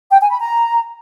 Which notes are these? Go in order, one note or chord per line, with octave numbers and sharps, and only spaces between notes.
G5
G#5
B5
A#5